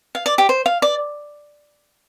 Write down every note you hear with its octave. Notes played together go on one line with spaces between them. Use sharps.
F5
D5
G4
C5
F5
D5